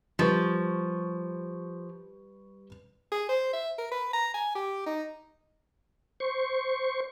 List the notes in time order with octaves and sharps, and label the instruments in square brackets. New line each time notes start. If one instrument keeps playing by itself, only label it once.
[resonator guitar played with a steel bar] F3 [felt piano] G3 B4 C#6
[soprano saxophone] G#4
C5
E5
A#4
B4
A#5
G#5
G4
D#4
[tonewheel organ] C5 C#6